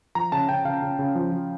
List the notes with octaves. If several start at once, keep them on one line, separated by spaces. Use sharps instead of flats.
F3 A#5
C#3 A5
C#3 G5
C#3 F5
C#3
C#3
F3
F3